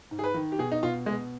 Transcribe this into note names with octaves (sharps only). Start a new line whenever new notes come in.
G#2
G#4
B4
D#3
G4
B2 G#4
D#4
B2 F4
B2 G#3